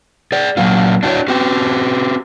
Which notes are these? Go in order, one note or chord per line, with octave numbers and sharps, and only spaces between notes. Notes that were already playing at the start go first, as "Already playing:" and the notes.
G#4 D5
A#2 F#3 A#3 F4
D4 E4 F#4 B4 C#5 D5
C4 F#4 G4